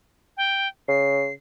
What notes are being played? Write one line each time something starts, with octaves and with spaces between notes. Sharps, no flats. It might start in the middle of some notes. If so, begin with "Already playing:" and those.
G5
C#3 C7